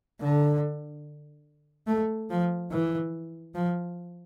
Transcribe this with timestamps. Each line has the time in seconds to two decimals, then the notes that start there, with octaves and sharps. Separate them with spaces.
0.21 D3
1.87 A3
2.30 F3
2.71 E3
3.55 F3